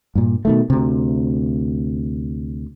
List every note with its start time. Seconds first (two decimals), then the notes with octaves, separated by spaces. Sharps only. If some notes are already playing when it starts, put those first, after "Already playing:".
0.15 G2 A#2
0.45 B2 D#3 A3
0.70 D2 C3